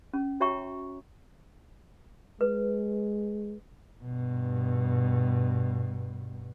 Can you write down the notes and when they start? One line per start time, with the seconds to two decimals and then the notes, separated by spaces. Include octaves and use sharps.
0.13 C#4
0.40 F#4 C#5 E5 G5 A#5 C#6
2.41 G#3 B4
4.04 G2 B2